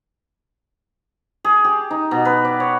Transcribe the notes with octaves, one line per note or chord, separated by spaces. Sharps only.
G#4
G4
D#4
B2
B4
D5
C#5